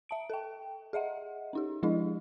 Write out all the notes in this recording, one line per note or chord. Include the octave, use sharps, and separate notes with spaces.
E5 A5 D7
A4 G5
G#4 D#5 E5 F#5
C#4 D#4 G4
F3 G#3 D4 E4 G#4 D#5